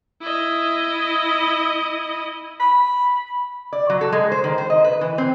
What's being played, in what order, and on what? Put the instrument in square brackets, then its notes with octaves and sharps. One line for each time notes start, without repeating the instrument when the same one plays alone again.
[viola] E4 D#5
[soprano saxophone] B5
[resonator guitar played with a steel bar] D5
F#3
A4
G#3
C5
D#3
C5
D#5
B4
E3
C4